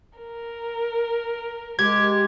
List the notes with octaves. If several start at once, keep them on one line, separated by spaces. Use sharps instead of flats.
A#4
G#3 G4 G#6